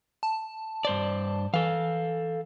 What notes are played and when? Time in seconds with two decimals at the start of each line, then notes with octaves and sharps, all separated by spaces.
0.23 A5
0.85 G2 C5 D5
1.54 E3 A4 F5